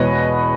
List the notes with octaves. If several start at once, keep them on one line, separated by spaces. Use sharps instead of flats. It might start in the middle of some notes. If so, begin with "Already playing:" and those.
Already playing: E2 B2 G#3 B4 C#5 D#5